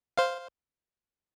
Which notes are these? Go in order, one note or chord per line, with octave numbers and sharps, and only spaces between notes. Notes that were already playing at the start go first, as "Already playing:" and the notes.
C5 F5